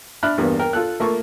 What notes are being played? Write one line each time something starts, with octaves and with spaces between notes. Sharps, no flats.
D4 E5 B5 F6 F#6
E2 G2 A#3 B3
A#4 G5
F4 A4 F#6
A3 A#3 F4 C#6